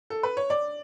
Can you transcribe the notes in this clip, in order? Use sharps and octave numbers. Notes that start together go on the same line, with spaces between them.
A4
B4
C#5
D5